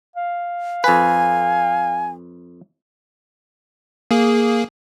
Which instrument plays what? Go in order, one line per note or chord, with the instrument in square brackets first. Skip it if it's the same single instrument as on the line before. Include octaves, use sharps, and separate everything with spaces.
[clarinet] F5
[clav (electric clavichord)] F2 B4 [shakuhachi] G#5
[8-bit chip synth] A#3 G#4